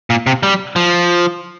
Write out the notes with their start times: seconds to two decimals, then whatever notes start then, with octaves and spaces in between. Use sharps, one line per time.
0.10 A#2
0.27 C3
0.43 G3
0.76 F3